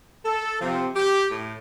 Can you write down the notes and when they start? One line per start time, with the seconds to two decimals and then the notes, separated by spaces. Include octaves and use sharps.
0.25 A4
0.61 C3 F3 C4
0.96 G4
1.30 A2